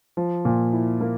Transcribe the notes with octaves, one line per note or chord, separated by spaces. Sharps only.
F3
A#2
E4
A#3